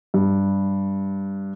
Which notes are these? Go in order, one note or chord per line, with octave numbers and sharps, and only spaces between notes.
G2